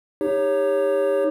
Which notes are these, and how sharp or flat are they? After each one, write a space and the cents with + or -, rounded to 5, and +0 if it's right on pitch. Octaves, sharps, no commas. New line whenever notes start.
D#4 +0 G4 +30 C#5 +0